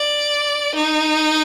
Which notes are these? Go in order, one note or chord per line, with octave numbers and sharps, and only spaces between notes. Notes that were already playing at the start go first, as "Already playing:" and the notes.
Already playing: D5
D#4